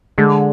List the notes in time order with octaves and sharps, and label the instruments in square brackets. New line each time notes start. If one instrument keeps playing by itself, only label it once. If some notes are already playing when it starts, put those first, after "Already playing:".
[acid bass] D3 [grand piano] G#3